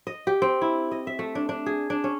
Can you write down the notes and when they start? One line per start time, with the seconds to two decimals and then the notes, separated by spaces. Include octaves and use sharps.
0.07 D#5
0.27 G4
0.42 C4
0.61 E4
0.91 D#5
1.07 E5
1.19 A3
1.35 D4
1.49 D4
1.66 G#4
1.90 D4
2.04 C#4